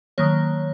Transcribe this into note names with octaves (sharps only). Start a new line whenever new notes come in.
D#3 F#3 A#3 C#5